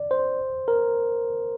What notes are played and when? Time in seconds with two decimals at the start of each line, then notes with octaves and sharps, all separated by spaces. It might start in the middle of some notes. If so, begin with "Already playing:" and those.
Already playing: D5
0.11 C5
0.68 A#4